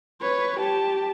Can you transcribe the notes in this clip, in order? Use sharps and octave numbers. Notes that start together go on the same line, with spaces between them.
B4 C#5
G4 A5